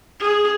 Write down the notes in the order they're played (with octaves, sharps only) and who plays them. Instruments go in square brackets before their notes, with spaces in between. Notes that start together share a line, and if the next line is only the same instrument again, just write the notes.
[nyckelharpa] G#4